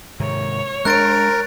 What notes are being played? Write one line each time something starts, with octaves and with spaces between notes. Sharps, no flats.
G#2 C3 D#3 C#5
G#3 D4 A#4 F#6 A6 D7